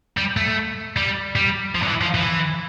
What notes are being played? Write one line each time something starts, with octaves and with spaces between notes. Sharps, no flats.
G3
A3
G3
G3
F3
D3
E3
F3
E3